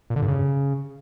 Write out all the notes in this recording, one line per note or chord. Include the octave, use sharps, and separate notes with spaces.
A#2
D3
G2
C#3